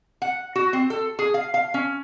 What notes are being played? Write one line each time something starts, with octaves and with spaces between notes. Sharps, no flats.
F#5
F#4
C4
A4
G#4
F5
F5
C#4